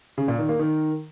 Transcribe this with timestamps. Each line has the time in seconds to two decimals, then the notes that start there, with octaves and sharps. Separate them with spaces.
0.18 C#3
0.28 A#2
0.38 D#3
0.49 A#3
0.59 D#3